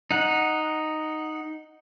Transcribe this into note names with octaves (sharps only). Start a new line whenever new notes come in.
D#4 F#5